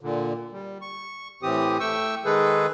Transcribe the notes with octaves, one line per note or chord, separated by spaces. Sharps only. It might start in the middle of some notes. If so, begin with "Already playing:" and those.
A#2 D3
G3
C#6
A2 E3 C4 G4 D#6
A3 G5 C#6 E6
D#3 G#3 G#4 A4 B4